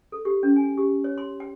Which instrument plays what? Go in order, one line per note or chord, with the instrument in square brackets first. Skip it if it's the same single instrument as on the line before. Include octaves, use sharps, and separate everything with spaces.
[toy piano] A4
G4
C#4
G#5
G4
C#5
C6
G5